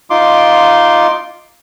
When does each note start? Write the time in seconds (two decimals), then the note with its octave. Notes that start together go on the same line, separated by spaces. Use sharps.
0.10 D#4 F4 C6 D6